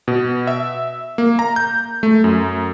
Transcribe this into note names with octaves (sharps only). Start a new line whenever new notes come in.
B2
E5
A#3
A#5
G6
A3
F#2